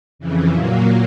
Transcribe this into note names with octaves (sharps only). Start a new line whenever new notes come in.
F2 C#3 E3
A#2 F#3 A#3